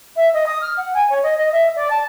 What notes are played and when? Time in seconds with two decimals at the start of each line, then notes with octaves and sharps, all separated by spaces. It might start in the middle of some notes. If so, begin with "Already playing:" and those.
0.16 E5
0.33 D#5
0.47 D#6
0.62 F6
0.77 F#5
0.94 G#5
1.10 C#5
1.23 D#5
1.38 D#5
1.52 E5
1.76 D5
1.90 A5